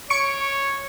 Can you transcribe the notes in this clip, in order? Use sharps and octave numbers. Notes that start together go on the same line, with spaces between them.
C#5 C#6 C#7 D7